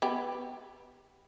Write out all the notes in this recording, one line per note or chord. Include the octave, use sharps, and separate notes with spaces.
B3 G4